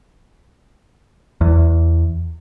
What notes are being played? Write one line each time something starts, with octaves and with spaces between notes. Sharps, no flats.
E2